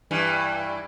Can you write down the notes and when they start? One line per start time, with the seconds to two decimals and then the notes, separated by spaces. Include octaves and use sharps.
0.11 G2 E3